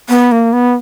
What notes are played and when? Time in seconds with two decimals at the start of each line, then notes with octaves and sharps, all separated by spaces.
0.09 B3
0.32 A#3
0.53 B3